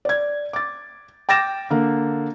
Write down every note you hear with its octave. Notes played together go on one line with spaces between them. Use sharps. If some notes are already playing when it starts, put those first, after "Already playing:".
D5 G#6
D6 A6
G5 D6 A6 A#6 E7
D3 A#3